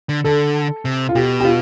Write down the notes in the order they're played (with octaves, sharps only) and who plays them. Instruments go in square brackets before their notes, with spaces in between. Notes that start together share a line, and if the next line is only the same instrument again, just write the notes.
[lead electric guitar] D3
[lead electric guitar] D3 [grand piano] A4
[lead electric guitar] C3
[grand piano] F4
[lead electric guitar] B2 [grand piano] G4
[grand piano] G4
F4